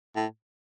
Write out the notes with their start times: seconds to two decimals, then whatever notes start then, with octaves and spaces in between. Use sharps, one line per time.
0.16 A2